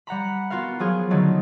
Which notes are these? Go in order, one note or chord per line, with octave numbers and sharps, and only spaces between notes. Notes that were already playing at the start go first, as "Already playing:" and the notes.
G3 F#5 A#5 B5
B3 F4 F#4 A#4 F5
F3 F#3 F4 G#4
D3 D#3 F#3 A3 D#4